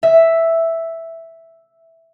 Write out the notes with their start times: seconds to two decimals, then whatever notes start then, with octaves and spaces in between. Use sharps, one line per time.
0.03 E5